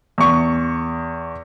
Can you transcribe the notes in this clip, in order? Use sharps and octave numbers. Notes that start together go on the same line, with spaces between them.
E2 C#6